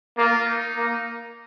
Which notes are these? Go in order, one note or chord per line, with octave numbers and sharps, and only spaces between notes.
A#3 F4
D#4
A#3